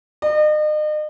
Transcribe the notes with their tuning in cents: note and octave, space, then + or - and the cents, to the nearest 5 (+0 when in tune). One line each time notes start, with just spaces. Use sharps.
D#5 -40